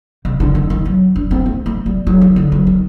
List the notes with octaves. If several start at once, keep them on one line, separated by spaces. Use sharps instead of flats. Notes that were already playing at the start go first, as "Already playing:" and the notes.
C3
D3
D#3
D#3
F#3
D4
C4
A3
A3
G3
F#3
D#3
D3
F#3
D#3